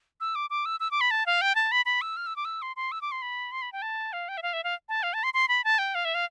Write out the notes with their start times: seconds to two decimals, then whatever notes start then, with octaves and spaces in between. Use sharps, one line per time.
0.21 E6
0.35 D6
0.50 D6
0.66 E6
0.80 E6
0.91 D6
1.01 B5
1.11 A5
1.26 F5
1.41 G5
1.55 A5
1.72 B5
1.86 B5
2.01 E6
2.17 F6
2.26 E6
2.36 D6
2.45 E6
2.62 C6
2.76 C6
2.92 E6
3.01 D6
3.12 C6
3.22 B5
3.52 C6
3.62 B5
3.73 G5
3.82 A5
4.13 F5
4.29 G5
4.37 E5
4.43 F5
4.53 E5
4.64 F5
4.89 A5
5.03 F5
5.14 A5
5.23 C6
5.34 C6
5.48 B5
5.64 A5
5.79 G5
5.95 F5
6.05 E5
6.15 F5